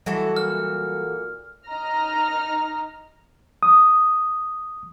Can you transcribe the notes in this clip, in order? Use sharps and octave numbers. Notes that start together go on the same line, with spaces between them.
E3 F#3 G3 A3 F#4 A4
A#2 F6
D#4 D#5 A#5 F6 A#6
D#6